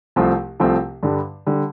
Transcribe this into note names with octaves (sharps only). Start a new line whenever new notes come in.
C2 C3 F3 A3 C4
C2 C3 F3 A3 C4
G2 D3 G3
D3 G3